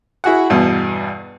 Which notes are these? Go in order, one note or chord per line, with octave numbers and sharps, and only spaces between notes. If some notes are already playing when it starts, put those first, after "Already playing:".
E4 F#4 G#4 F#5
E2 G2 B2